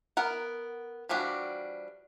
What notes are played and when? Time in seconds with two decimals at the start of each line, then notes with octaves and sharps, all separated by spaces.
0.17 B3 A#4 F#5
1.09 E3 F3 G3 D4 F#4